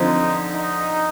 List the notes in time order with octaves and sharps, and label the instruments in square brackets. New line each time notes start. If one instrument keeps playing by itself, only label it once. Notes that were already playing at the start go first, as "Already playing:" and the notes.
Already playing: [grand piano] D3 F3 C4 [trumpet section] D#4
[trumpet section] D#4